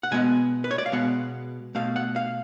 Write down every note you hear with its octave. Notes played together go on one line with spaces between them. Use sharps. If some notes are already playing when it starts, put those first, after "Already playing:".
F#5
B2 G#3 B3 G#5
B4
C#5
D5
F5
B2 G#3 B3 F#5
B2 A3 F5
F#5
F5